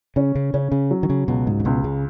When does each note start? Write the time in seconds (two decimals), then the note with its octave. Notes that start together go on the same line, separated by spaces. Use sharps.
0.16 C#3 C#4
0.35 C#3
0.54 C#3 C#4
0.72 C#3
0.91 F#3
1.03 D#3
1.10 C#3
1.28 C#2 B2
1.47 G#2
1.60 C#3
1.65 C#2 B2
1.84 C#3